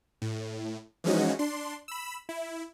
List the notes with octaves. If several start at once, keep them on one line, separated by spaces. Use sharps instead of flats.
A2
E3 F3 G#3 C#4 D#4 F#4
D4 C6
B5 E6
E4